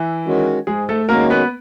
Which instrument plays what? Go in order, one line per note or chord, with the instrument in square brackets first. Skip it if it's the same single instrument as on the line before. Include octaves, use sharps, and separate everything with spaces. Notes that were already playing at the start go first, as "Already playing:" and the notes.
Already playing: [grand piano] E3 E4
[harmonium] D#3 G#3 C#4 F#4
[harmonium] G#2 [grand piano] G#3 G#4
[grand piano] A3 A4
[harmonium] D#3 G#3 C#4 F#4 [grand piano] A#3 A#4
[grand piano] B3 B4